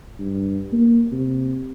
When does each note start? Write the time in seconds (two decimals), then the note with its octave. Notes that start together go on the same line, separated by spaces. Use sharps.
0.19 G2
0.73 A#3
1.12 C3